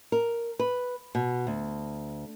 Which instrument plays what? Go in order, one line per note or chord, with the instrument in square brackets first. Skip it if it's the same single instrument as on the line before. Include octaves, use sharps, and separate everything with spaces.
[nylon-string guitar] A#4
B4
B2
D2